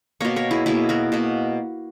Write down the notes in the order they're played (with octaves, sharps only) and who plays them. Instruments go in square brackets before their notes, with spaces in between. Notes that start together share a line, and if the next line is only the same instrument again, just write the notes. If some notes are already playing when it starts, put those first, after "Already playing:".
[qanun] B2 A#3 A#4 C#5
A#4 C#5
E4 G#4
B2 A#3 E4 G#4
F#4 A#4
B2 A#3